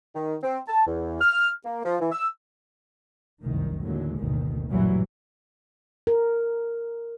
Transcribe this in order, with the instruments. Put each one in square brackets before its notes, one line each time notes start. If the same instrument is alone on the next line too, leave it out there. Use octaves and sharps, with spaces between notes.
[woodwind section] D#3
C4
A5
E2
F6
A#3
F3
E3
E6
[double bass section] F1 C2 F#2 D#3
A1 D#2 D3 F#3 G#3
F#1 D2 B2 D#3
A1 F#2 A#2 E3 F#3 G3
[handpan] A#4